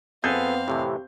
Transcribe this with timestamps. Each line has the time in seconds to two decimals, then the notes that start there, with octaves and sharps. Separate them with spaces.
0.24 F2 B3 C4 G#4 A4 B4 F5 G6
0.68 A2 C3 E3 G4